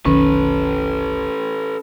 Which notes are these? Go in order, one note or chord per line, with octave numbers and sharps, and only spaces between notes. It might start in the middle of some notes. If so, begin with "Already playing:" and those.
F1 B1 D#3 C#4 A4 B4